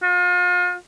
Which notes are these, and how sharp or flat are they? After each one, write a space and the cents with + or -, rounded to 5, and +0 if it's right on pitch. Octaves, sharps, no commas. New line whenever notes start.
F4 +40